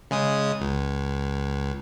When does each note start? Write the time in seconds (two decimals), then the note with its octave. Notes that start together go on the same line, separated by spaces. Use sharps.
0.11 C#3 G#3 D#6
0.61 C#2